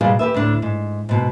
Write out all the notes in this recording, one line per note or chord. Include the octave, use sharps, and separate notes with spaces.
G#2 B2 G3 G#4 B4 F5
G4 G#4 B4 E5
D2 A2 D4
G#2
G#2 B2